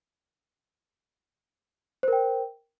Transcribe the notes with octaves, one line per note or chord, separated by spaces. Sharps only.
A#4 C5 G5